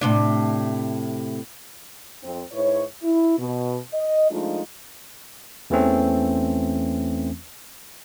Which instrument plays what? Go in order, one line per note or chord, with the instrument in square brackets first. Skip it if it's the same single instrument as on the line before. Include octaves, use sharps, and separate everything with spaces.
[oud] A2 C3 D4
[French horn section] F2 C4
G#2 E4 B4 C#5
E4
B2
D#5
F3 G#3 A3 D4 D#4 F4
[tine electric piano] E2 E3 A3 C4 C#4